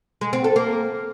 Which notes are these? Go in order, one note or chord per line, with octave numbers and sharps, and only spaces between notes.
G#3
C4
A4
A#3